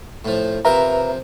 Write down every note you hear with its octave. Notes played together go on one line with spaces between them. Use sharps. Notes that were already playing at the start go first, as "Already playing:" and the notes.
A2 F3
C3 F3 A#4 B4 E5 A#5